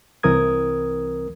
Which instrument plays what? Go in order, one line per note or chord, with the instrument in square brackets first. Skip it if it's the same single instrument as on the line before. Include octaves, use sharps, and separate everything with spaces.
[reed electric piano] C2 E3 C4 A#4 D#6 G#6